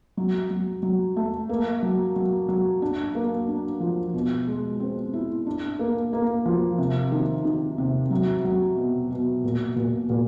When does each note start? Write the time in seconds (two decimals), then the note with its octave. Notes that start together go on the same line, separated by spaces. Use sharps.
0.17 F#3
0.50 F#3
0.83 F#3
1.16 A3
1.49 A#3
1.83 F#3
2.16 F#3
2.48 F#3
2.82 D4
3.15 A#3
3.48 D4
3.80 F3
4.13 B2
4.47 G#3
4.80 C4
5.13 E4
5.47 D4
5.79 A#3
6.13 A#3
6.46 F3
6.78 C3
7.12 D#3
7.45 D#3
7.78 C3
8.11 F#3
8.45 F#3
8.77 B2
9.11 B2
9.44 A#2
9.76 A#2
10.10 A#2